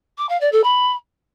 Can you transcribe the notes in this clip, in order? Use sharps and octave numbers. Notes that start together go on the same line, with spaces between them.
D6
F5
D5
A4
B5